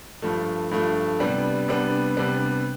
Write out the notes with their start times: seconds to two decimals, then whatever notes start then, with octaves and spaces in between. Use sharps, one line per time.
0.22 G2 F3 A3
0.71 G2 F3 A3
1.20 C3 G3 B3 D4
1.68 C3 G3 B3 D4
2.17 C3 G3 B3 D4